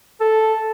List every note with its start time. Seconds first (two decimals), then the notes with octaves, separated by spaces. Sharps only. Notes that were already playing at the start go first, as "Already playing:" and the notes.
0.20 A4